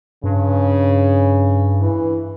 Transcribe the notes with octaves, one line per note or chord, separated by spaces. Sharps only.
G2 C#3
E3